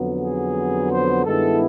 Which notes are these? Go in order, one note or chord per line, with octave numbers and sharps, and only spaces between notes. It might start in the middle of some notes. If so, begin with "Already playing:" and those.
Already playing: F2 D3 F#3 B3
G#4
C5
G2 D#3 G#3 B3 E4 A4